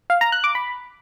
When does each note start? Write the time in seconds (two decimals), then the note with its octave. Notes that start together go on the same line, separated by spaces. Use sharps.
0.10 F5
0.21 A#5
0.32 F#6
0.44 D6
0.55 B5